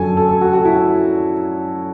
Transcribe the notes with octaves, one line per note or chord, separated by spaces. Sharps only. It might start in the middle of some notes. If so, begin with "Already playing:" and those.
Already playing: F#2 D3 F#3 A4 G#5
A4
A4
F#4
F#4
E4